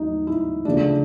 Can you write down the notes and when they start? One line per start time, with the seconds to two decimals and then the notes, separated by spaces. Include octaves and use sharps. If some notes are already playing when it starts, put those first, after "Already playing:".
Already playing: D#2 F#3 A3 D#4
0.27 E4
0.65 D2 C#3 F3 A3 D4